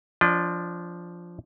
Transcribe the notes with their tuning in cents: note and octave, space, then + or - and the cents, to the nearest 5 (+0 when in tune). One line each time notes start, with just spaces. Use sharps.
F3 -5 D4 -20 D#5 -45